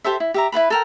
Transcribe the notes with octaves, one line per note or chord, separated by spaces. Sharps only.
G4 A4 C5 E5
E4
G4 E5 A#5
E4 F4 B4 B5
A4 A#4 G5